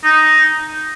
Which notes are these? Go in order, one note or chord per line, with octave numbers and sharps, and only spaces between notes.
D#4